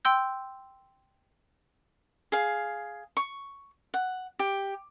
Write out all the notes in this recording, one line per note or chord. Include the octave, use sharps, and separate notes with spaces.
G5 C6 E6 G6
G#4 F5
C#6
F#5
G4